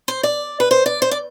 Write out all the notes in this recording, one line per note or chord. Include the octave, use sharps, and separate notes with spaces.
C5
D5
B4
C5
D5
C5
D5